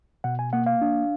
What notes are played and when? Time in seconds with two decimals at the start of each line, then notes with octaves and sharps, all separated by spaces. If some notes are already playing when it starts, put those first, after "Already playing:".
0.24 B2 F#5
0.39 G#5
0.53 A#3 F#5
0.66 F5
0.82 D4